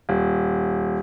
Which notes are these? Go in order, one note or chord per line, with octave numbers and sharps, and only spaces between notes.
D#1